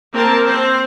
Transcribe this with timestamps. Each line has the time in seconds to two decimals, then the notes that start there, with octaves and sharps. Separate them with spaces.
0.13 A#3 C4 A#4 A5
0.46 C4 C5